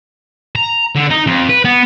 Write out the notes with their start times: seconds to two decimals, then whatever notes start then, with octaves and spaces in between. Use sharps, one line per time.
0.56 A#5
0.96 D3
1.11 D#4
1.27 F2
1.49 B4
1.65 B3